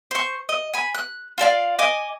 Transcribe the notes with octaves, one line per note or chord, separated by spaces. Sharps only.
C5 C#6
D#5
G#5 B5
F#6
F4 A4 D5 F5
D#5 G#5 D6